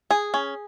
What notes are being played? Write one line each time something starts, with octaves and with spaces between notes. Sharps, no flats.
G#4
C#4